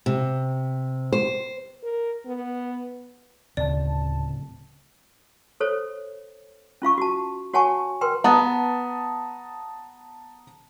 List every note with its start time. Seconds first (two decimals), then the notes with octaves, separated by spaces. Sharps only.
0.06 C3
1.13 C5
1.83 A#4
2.26 B3
3.57 D1 D2 C#3 C4 D5 A5
5.60 A4 C5 C#5
6.82 C#4 F4 F5 C#6
6.98 F#4 A5
7.53 F#4 C#5 F#5 G#5 A5 C#6
8.01 A#4 B4 G5 C6
8.24 B3 A5 A#5 D#6